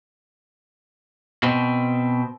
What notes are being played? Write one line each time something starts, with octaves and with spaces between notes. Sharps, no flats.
B2 C4